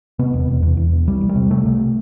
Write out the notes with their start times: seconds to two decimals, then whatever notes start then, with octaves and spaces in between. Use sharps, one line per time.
0.19 C3 B3
0.34 E1
0.48 E1
0.63 E2
0.77 E2
0.92 E1
1.07 C2 G3
1.21 C2
1.29 G3
1.36 C3
1.50 C3 A3
1.66 C3